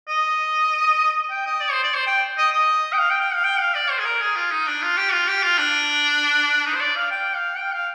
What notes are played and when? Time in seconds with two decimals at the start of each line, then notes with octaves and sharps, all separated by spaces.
0.08 D#5
1.31 G5
1.46 D#5
1.61 D5
1.72 C5
1.84 D5
1.95 C5
2.07 G5
2.38 D#5
2.53 D#5
2.93 G5
2.99 F5
3.11 G5
3.21 G5
3.34 F5
3.44 G5
3.60 F5
3.75 D5
3.91 C5
3.99 G#4
4.05 A#4
4.22 G#4
4.36 F4
4.52 D#4
4.67 D4
4.82 F4
4.98 G4
5.13 F4
5.28 G4
5.43 F4
5.58 D4
6.66 D#4
6.75 C5
6.81 D5
6.96 F5
7.12 G5
7.35 F5
7.57 G5
7.72 F5